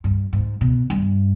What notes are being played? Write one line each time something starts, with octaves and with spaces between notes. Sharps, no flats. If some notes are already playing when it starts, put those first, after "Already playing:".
G2
G#2
B2
G2